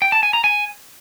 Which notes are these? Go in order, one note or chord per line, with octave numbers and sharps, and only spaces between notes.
G5
A5
G#5
A#5
G#5